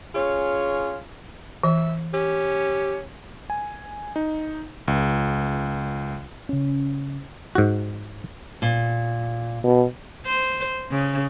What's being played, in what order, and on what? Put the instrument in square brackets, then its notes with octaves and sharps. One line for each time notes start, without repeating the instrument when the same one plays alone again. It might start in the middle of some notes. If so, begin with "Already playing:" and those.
[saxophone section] C#4 F4 G#4 C#5
[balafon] E3 [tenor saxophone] E5
[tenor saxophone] C#4 [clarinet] G4
[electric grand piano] G#5
D#4
C#2
[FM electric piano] C#3 C#4
[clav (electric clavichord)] G#2 F#4
[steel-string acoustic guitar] A#2
[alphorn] B2
[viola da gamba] C5
C#3